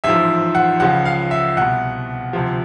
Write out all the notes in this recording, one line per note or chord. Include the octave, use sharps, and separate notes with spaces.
A1 G#2 F3 E5
F#5
C#2 C#3 F3 F#5
F5
E5
C2 B2 F#5
D2 C3 F3